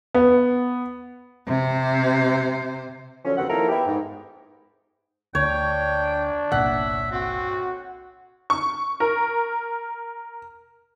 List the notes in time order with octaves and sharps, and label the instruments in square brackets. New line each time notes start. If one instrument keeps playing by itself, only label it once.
[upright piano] B3
[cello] C3 C5
[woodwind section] D3 F3 F#3 C#4
D#2 C#3 F#3 B3 C4 F#5
D#3 F3 A#3 E4 A4 A#4
B3 E4 G4
G#2
[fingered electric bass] D2 [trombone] D4 [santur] C#5 [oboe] G5
[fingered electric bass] G1 C2 A#2 [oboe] E5 [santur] F#5
[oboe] C4 [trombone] F#4
[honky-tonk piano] C#6
A#4